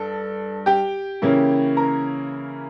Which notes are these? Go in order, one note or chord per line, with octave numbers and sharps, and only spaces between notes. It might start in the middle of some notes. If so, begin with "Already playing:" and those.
Already playing: G2 A4
G4 G5
C#3 E3 A#3 C#4 E4
A#4 A#5